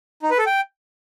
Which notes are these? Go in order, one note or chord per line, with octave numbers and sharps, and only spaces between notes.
D#4
B4
A4
G5